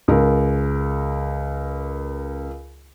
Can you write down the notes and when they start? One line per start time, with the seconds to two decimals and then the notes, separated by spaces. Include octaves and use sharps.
0.08 C#2 A#4